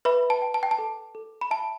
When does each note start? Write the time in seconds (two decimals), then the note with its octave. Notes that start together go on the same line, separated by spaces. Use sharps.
0.05 B4 E5 B5
0.30 A5
0.42 G5
0.54 A5
0.63 G5
0.71 A5
0.79 A4
1.15 A4
1.41 B5
1.51 E5 A5